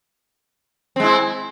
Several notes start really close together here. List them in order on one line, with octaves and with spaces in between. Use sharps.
C4 G#3 E4